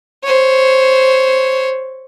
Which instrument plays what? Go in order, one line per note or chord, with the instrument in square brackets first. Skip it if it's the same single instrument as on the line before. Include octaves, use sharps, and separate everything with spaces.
[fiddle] C5 C#5